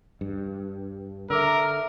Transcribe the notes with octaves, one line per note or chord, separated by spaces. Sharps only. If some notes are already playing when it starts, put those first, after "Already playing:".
G2
D3 A#4 E5 D6 E6